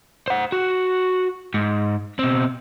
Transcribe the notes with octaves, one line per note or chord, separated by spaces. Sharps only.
C5 F#5
F#4
G#2
B2 C4